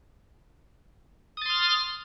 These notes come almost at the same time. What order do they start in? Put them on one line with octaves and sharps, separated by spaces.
D#6 A6 C6 F6